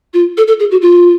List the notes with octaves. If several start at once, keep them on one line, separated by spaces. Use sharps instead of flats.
F4
A4
A4
G#4
F#4
F4